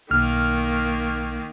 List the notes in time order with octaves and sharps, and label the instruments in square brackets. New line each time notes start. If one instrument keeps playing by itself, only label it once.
[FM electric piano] B1 F6 [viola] D#3 A#3